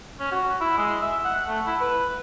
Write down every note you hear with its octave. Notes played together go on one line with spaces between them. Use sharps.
C#4
F#4
E4
G#3
E5
F#5
A3
E4
B4